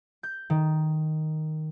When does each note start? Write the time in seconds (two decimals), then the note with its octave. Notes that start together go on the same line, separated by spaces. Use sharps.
0.23 G6
0.50 D#3